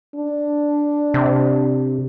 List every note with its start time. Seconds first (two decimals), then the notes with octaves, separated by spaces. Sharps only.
0.16 D4
1.14 C3